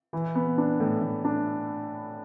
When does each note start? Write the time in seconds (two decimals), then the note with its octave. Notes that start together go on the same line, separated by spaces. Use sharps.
0.13 E3
0.35 B3
0.58 D4
0.80 A2
1.02 A2
1.24 D4